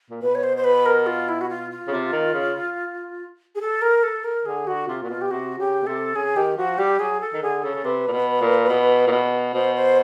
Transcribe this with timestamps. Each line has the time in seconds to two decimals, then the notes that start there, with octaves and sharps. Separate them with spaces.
0.10 A#2
0.22 B2 B4
0.35 C#5
0.43 C5
0.56 C5
0.64 B4
0.85 A#4
1.06 F4
1.28 E4
1.41 F#4
1.49 F4
1.70 F4
1.87 C#3
1.91 C3
2.13 D#3
2.34 C#3
3.55 G#4
3.60 A4
3.81 A#4
4.03 A4
4.24 A#4
4.45 D3 G#4
4.67 D3 F#4
4.87 C3 F4
5.02 A#2 F#4
5.08 B2 F4
5.21 G4
5.31 C3 F#4
5.58 C#3 G4
5.82 B2
5.86 C3 A4
6.15 C#3 G#4
6.36 D#3 G4
6.57 F3 F#4
6.78 G3 G4
6.99 F#3 G#4
7.20 A4
7.34 D#3
7.42 D3 G#4
7.63 C#3 A4
7.75 C#3
7.84 C3 B4
8.08 A#2
8.12 B2
8.41 A#2
8.68 B2
9.07 A#2
9.11 B2
9.54 B2 C5
9.75 C5